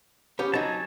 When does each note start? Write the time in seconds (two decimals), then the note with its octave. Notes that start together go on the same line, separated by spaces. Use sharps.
0.39 B3 C#4 G4
0.54 F#3 D#4 G#5 A5